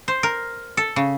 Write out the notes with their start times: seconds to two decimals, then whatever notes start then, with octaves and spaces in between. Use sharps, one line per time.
0.08 C5
0.23 A#4
0.77 A4
0.96 C#3